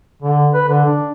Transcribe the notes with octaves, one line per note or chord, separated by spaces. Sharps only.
D3
B4
D3
D4